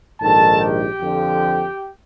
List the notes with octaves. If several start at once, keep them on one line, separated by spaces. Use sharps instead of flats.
A#1 G#2 D#3 A4 A5
G4 G5
F2 D3 F3